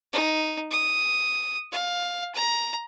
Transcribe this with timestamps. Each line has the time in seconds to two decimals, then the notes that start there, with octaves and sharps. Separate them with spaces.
0.13 D#4
0.71 D#6
1.72 F5
2.35 A#5